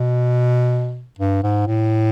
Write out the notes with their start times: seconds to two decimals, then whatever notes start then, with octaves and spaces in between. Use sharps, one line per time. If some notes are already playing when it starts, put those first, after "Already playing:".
Already playing: B2
1.19 G2
1.43 G#2
1.66 A2